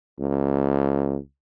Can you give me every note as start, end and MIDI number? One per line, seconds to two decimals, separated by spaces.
0.20 1.16 37